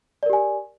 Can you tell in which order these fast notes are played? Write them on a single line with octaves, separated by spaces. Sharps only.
D5 A#4 G4 G#5